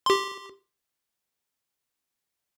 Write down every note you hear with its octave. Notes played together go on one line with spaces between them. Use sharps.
G4 C6